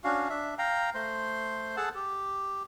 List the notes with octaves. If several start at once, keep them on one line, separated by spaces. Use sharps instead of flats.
C#4 D4 F#4 F5
D4 E5
F5 G5 A#5
A3 C5 C6
G#4 A4 F#5 A5
G4